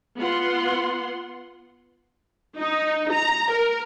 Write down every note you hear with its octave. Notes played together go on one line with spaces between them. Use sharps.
B3 F4 F#5 C6
D#4
A#5
A#4